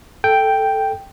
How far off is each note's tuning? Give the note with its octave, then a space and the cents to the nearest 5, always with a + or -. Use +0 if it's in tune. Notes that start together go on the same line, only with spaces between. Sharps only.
A4 +0 G5 +0